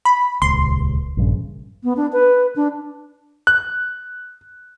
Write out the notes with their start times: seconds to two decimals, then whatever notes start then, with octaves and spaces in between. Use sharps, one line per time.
0.05 B5
0.42 D#1 C#2 C6
1.17 A#1 G2 C#3
1.84 B3
1.97 D4
2.13 B4
2.56 D4
3.47 F#6